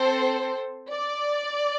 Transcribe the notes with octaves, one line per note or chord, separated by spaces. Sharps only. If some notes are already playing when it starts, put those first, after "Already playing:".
Already playing: C4 A4 C5
D5